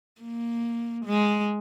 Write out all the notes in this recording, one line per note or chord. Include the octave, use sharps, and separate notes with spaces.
A#3
G#3